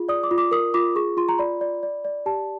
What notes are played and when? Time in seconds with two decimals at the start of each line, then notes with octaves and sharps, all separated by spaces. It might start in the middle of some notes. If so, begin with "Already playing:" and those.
Already playing: F4 G#4
0.09 D5 D#6
0.23 D6
0.31 F4
0.38 D6
0.51 A#4 D#6
0.74 F4 D6
0.96 G#4 C#6
1.17 F4 C6
1.29 A#5
1.38 D5 B5
1.61 D5
1.83 D5
2.05 D5
2.26 G4 A5